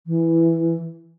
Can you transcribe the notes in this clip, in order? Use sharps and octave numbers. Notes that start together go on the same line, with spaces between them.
E3